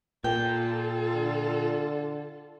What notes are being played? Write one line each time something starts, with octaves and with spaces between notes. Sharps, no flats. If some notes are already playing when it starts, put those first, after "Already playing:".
A#2 F4 A4 G5
D3